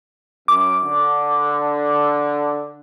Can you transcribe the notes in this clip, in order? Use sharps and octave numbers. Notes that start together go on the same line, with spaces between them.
F#2 D6
D3